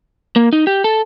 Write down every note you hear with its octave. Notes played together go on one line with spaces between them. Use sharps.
A#3
D#4
G4
A4